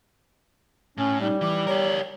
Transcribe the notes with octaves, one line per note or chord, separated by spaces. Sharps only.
A2 C#4
G3 D#4
E3 D6
G4 A#4 C#5